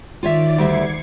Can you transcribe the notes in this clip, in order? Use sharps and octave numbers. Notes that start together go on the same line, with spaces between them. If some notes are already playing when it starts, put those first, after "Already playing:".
D#3 F4 C#5 D5 E5 D6
D2 G3 E5 G#6 C7 C#7